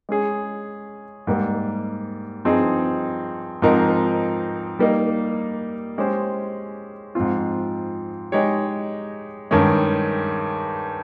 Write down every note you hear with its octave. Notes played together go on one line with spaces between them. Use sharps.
G#3 C#4 G#4
G#2 G3 A#3
G2 F3 C4 D#4 G#4
G#2 F3 C4 D#4 A#4
G3 A#3 D#4
G#3 C#4 G4 C5
G#2 F3 C4 F4
G#3 D#4 G4 C#5
G2 D#3 G#3 C#4